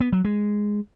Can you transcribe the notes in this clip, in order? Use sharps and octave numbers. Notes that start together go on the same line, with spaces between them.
B3
F#3
G#3